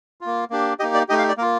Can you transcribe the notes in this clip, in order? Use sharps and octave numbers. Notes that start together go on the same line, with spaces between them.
A#3 F4
A#3 D4 G4
A#3 D#4 G4 D#5
D5
A3 D#4 G4 D#5
F5
D5
A#3 F4 A#4